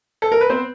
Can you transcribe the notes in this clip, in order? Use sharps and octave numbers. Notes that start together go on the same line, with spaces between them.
A4
A#4
B4
B3 C4 C5